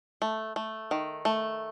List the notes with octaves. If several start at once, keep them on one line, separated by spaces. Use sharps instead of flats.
A3
A3
D#3
A3